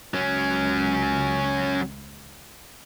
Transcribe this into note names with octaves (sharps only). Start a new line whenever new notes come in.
C#2 F#3 C#4